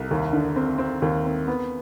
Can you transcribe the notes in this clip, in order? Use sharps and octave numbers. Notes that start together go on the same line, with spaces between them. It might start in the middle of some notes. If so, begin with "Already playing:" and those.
Already playing: C2
D#2
D3
C4
C4
D#2
C4
B3